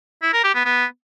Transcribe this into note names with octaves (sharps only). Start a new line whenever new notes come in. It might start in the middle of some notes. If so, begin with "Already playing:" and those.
E4
A#4
G4
B3
B3